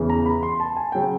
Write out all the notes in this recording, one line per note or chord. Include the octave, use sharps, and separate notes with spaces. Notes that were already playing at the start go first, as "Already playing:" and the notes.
Already playing: E2 C#3 E3
A#5
B5
C6
A5
G#5
C#3 F#3 G5